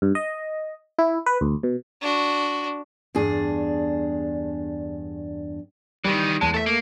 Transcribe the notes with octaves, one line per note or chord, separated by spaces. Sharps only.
G2
D#5
E4
B4
D2
B2
D4 F#4
E2 G2 D4 G#4
D#3 E3 G3
E2 G#3 A5
A3 A4 E5
A#3